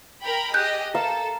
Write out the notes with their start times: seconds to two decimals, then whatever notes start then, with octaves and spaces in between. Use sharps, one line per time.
0.23 A#4 G5 B5
0.54 G4 G#4 D#5 F#6 G6
0.94 A4 A#4 F5